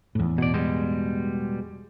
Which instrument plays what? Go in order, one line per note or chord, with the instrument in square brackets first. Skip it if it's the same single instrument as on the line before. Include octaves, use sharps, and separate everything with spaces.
[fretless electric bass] E2 A2
[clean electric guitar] B2 D5
B2 G3 G#3